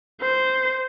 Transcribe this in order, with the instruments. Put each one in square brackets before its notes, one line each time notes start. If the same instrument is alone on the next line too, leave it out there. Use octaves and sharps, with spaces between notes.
[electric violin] C5